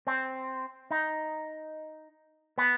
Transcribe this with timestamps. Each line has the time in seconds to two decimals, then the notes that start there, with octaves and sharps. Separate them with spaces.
0.07 C4
0.91 D#4
2.58 B3